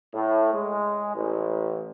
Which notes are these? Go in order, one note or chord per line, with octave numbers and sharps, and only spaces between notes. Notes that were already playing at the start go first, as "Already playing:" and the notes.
A2
G#3
A1